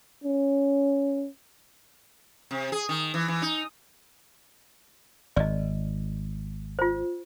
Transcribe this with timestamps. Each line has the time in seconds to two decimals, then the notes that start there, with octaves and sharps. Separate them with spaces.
0.24 C#4
2.51 C3
2.72 G#4
2.89 D#3
3.14 E3
3.28 E3
3.42 D#4
5.36 G#1 D5 D#5
6.79 F4 C5